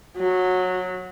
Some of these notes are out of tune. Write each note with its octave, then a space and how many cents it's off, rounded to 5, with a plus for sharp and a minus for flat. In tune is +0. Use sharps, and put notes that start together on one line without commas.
F#3 -15